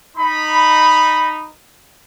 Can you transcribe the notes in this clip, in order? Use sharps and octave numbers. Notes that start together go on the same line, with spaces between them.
D#4 B5